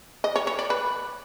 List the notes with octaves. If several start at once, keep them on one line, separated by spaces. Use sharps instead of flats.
D#5
C#5
C#5
D5
B4